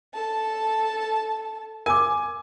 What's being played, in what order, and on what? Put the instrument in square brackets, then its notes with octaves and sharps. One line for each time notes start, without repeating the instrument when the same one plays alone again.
[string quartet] A4 A5
[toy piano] A#4 D6 [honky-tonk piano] G#5